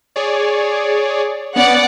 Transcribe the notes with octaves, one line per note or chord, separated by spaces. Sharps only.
G#4 C#5 D5
B3 C#4 D5 F#5